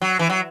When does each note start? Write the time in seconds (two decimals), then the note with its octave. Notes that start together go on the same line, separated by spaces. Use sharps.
0.02 F#3
0.19 E3
0.30 F#3